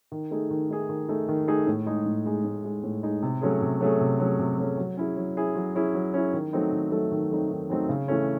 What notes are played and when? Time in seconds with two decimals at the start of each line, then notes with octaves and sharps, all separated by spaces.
0.12 D#3
0.31 A3 D#4 G#4
0.50 D#3
0.70 A3 D#4 G#4
0.89 D#3
1.09 A3 D#4 G#4
1.28 D#3
1.47 A3 D#4 G#4
1.67 A2
1.86 G#3 D#4 G#4
2.06 A2
2.25 G#3 D#4 G#4
2.44 A2
2.64 G#3 D#4 G#4
2.84 A2
3.03 G#3 D#4 G#4
3.23 C3
3.42 F#3 A3 C#4 G#4
3.61 C3
3.81 F#3 A3 C#4 G#4
4.00 C3
4.20 F#3 A3 C#4 G#4
4.39 C3
4.58 F#3 A3 C#4 G#4
4.78 F#3
4.97 C#4 E4 G#4
5.17 F#3
5.37 C#4 E4 G#4
5.56 F#3
5.75 C#4 E4 G#4
5.95 F#3
6.14 C#4 E4 G#4
6.33 D#3
6.53 F#3 A3 C4 D#4
6.72 D#3
6.92 F#3 A3 C4 D#4
7.11 D#3
7.31 F#3 A3 C4 D#4
7.50 D#3
7.70 F#3 A3 C4 D#4
7.89 C#3
8.08 E3 A3 C#4